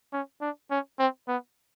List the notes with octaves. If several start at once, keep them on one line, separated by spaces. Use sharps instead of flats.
C#4
D4
C#4
C4
B3